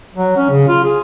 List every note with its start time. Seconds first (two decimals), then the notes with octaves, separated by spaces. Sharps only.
0.16 F#3
0.37 C#4
0.50 C#3
0.68 F4
0.84 G#4